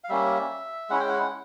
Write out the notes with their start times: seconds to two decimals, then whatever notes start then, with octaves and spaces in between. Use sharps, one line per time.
0.04 F5
0.09 G3 A#3 C#4 E5
0.90 G#3 C#4 E4 F#5
1.00 G5
1.09 F#5